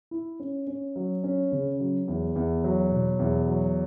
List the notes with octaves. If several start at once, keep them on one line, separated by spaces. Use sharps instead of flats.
E4
C#4
C#4
F#3
C#4
C#3
F#3
E2
E2
F#3
B2
E2
F#3